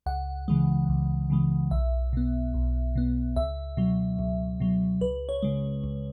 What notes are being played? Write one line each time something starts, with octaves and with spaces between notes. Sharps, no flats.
C#2 F#5
C#3 E3 G#3
C#2
C#3 E3 G#3
B1 E5
B2 B3
B1
B2 B3
C#2 E5
B2 F#3
C#2
B2 F#3
C#2 B4
C#5
C#3 G#3
C#2